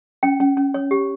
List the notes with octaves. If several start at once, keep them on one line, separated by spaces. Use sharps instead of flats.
C#4 G5
C#4
C#4
C#5
G4